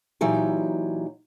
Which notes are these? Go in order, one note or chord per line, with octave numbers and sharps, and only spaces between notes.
A#2 E3 F#3 D#4 G4